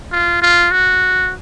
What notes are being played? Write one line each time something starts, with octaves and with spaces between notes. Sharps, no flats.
F4
F4
F#4